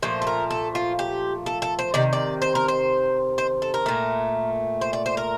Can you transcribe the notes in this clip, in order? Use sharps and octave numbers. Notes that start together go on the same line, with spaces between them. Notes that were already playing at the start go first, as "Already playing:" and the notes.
A#2 F3 A3 C5
A4
A#4
A4
F4
G4
A4
A4
C5
C3 D#3 D5
D5
C5
A#4
C5
C5
A4
A#4
A#2 A3
C5
D5
C5
A#4